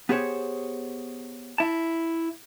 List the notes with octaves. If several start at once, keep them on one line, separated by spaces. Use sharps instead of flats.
B3 G4 G#4 C5 C#5
E4 A5